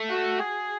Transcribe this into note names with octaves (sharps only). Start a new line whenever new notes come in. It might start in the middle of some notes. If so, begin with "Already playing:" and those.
Already playing: A3
F#4
G#4